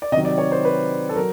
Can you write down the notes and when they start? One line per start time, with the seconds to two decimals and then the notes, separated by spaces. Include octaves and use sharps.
0.02 D5
0.12 C3 D#5
0.15 D#3 F#3
0.25 D5
0.38 C#5
0.52 C5
0.65 B4
1.09 A4
1.16 F#3 A#4